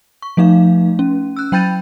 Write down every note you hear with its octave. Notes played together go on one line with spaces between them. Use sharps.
C#6
F3 A3 D#4 F5
C#4
E6 F#6
F#3 G5 B5 G6 A6 D#7